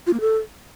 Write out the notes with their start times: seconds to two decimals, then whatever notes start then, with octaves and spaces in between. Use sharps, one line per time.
0.07 F4
0.14 A#3
0.20 A4